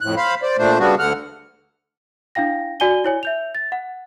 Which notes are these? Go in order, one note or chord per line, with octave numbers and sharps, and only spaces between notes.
F2 A2 F#6
C5 F5 B5
C5 D5
A#2 A3 D4 C5
C#3 G3 B3 D4 F#4
D2 D3 F#5 F6
D4 E4 F5 G5 A#6
F#4 D5 G#5 D#7 G7
E4 C#5 G#5
E5 G6 F7
A6
F#5